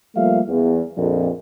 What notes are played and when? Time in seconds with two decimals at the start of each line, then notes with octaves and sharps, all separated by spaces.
0.15 F3 G3 A3 A#3 E5 F5
0.48 E2
0.96 A#1 F2